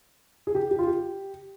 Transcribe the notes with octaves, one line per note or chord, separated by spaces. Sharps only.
G#4
G4
G4
F4
G4